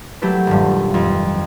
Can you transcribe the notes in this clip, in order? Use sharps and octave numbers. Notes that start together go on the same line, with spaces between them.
F#3 A3 G4 A4 B4
D#1 G2
F2